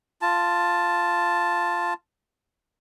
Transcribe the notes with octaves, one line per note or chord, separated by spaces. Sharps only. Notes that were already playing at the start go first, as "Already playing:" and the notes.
F4 A5